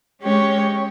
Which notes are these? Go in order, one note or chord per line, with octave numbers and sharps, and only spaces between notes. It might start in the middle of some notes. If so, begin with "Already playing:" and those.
G#3 C#4 G4 C#5